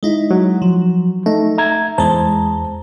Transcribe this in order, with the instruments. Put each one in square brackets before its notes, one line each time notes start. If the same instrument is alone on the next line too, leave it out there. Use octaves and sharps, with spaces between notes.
[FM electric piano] G#3 D#4 E4
[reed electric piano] F#3
[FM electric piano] F3
[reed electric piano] A3 [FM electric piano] D#4
[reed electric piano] E5 A#5 G#6
[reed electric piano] E2 A5 A#5 [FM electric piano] G#3 C5